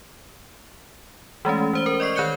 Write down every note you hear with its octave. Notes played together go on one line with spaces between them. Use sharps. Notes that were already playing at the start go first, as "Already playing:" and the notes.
E3 G#3 A3 C#4
E3 C5 G7
A#4
D5 D#5 C#6 C7
D#3 C#5 F#6 G6 C#7 G7